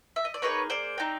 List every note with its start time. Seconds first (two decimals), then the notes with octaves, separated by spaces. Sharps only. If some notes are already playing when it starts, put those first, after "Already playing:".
0.16 E5
0.25 D#5
0.34 D5
0.42 A#3 D#4 G#4 B4 C#5
0.70 C5 D5
0.98 C4 D#4 G4